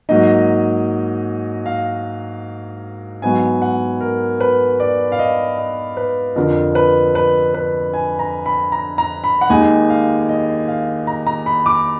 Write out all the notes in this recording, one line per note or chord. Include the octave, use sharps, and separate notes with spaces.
G#2 F#3 A#3 D#4 D#5
F5
G#2 F#3 B3 D#4 G#5
F#5
A#4
B4
D5
F5
D#5
D#5
B4
F2 D3 F3 A#4
B4
B4
B4
G#5
A#5
B5
A#5
A#5
B5
F#5
D#2 D#3 G#3 D#4 G#5
F5
D#5
F5
A#5
A#5
B5
D6